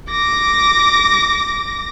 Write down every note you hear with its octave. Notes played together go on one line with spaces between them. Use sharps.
D6 A#6